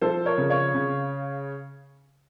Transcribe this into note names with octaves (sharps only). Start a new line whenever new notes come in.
F3 A4 C5
A#4 C#5
C#3
C#5 F5
C#3